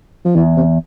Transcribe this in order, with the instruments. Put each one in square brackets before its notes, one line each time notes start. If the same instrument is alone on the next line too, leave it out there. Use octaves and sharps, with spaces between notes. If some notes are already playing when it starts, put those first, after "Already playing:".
[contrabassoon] F3
[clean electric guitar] E2 [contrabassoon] E3
[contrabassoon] C3